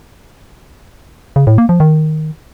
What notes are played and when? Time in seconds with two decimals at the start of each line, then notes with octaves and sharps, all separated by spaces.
1.36 C#3
1.47 A2
1.58 A#3
1.69 F3
1.80 D#3